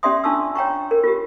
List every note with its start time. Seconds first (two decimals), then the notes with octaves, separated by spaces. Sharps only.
0.03 C#4 G4 D5 E5 C6 D#6
0.24 D4 F4 A5 C6 C#6 E6
0.56 C#5 G5 A#5 C#6
0.91 A#4
1.04 F4 G4